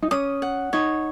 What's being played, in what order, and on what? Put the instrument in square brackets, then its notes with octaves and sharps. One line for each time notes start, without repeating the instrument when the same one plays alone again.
[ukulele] D#4
[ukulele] C#4 [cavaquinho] D#6
[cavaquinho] F#5
[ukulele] D#4 [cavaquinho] C#5